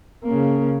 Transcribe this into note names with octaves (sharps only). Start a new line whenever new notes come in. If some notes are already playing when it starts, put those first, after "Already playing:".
C#3 A#3